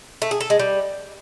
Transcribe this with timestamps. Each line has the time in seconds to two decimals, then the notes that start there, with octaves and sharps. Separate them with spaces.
0.22 A3
0.31 G#4
0.41 A4
0.50 G#3
0.59 G3